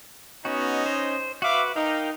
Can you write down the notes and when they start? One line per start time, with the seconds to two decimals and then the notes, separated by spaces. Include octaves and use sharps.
0.45 B3 C#4 D#4 F#4 D#5
0.86 C5
1.42 F#4 B4 E5 F5 D6
1.76 D#4 A#4 F5 G5